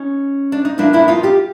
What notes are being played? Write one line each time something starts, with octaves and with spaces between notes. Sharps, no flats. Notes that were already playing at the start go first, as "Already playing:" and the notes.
Already playing: C#4 D#4
D4
D#4
A#2 F3 A#3 D4 E4
D4 E4
D#4 F4
F4 G4